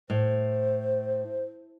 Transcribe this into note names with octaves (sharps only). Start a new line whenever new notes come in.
A2 C5